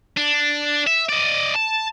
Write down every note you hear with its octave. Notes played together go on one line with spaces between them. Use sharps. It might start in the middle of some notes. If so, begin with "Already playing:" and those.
D4
E5
D5 D#5
A5